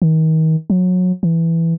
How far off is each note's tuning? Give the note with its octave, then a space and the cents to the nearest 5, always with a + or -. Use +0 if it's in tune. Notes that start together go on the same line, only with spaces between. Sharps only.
D#3 +35
F#3 -25
E3 +5